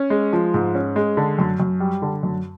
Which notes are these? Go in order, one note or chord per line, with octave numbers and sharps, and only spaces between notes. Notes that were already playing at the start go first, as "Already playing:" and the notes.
Already playing: C#4
G#3
F3
G#2
C#4
G#3
D3
F#2
F#2
G3
D3
F#2